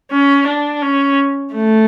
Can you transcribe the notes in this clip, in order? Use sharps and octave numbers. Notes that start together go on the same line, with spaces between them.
C#4
D4
C#4
A3